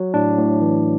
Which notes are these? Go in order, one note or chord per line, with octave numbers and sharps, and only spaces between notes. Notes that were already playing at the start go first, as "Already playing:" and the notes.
Already playing: F#3
A2 D4
A2
E3